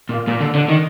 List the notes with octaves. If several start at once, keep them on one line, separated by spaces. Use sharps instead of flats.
A#2
A#2
D3
D3
D#3